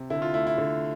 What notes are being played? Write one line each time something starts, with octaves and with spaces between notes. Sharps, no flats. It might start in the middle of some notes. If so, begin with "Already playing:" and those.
Already playing: C3
D3 E4
F4
A3 E4
E4
D3